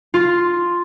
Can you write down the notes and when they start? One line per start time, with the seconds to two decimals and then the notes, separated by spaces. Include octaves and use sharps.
0.14 F4